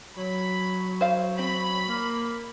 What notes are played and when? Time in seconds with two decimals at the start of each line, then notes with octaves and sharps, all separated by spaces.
0.16 F#3 C#5 B5
1.01 C5 F5
1.39 C4 B5
1.88 A#3